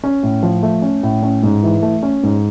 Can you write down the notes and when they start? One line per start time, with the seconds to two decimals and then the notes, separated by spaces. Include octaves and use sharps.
0.04 C#4
0.23 A2
0.43 F3
0.63 A3
0.82 C#4
1.03 A2
1.23 C#4
1.43 G#2
1.63 E3
1.82 A3
2.03 C#4
2.23 G#2